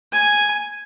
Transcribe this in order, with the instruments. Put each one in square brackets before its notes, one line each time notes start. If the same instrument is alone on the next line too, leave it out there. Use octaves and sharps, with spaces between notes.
[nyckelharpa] G#5